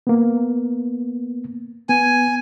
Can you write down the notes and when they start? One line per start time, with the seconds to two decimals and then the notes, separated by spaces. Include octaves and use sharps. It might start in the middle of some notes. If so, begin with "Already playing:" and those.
0.07 A#3 B3
1.89 B3 G#5